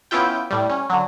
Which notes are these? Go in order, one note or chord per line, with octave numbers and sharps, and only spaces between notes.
B3 C#4 E4 F4 G5
A2 G3
C#4
D3 F#3